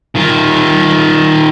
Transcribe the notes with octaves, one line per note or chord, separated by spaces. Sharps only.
D#3 F4